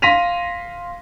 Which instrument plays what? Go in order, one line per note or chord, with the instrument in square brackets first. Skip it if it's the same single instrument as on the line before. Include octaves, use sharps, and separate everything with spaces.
[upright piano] F5 C6 A#6 B6 D#7 F7